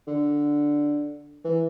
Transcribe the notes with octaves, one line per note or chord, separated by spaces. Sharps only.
D3
E3